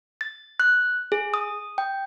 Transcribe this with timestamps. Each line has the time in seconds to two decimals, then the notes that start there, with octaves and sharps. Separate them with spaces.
0.21 A6
0.60 F#6
1.12 G#4
1.34 D#6
1.78 G5